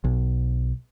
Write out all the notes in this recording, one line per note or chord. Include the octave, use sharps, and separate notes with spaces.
B1